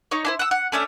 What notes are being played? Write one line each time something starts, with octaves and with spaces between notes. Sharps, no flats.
D#4 C#5
D4 E4 C5
F#5 E6
F#5
A3 C#4 D4 E5